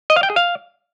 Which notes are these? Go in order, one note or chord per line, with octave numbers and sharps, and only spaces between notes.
D#5
F5
G5
G#4
F5